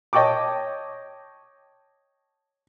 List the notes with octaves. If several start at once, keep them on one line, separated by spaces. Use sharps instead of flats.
C#5 D#5 G5 A5 C#6 D6